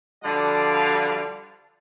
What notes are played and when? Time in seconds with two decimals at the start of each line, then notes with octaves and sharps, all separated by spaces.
0.24 D3 F3 G3 F#4 D5 F5